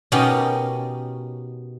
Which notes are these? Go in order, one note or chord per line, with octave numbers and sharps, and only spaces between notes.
B2 B3 C#4 D#4 G4 A#4